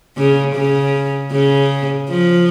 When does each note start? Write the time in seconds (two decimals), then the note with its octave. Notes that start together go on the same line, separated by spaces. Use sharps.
0.17 C#3
0.55 C#3
1.32 C#3
2.10 F3